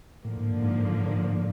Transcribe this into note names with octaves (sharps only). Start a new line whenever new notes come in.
A2 D3 F3 A#3
G#2
G2
G#2